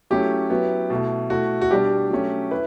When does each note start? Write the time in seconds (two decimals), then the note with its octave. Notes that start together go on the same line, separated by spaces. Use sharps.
0.10 F#3 A3 C#4 E4 G4
0.50 F#3 B3 E4
0.90 B2 A3 E4
1.30 B2 A3 E4 F#4
1.62 F#4
1.70 B2 G3 D4 G4
2.10 F#3 A3 C#4
2.51 E4 B4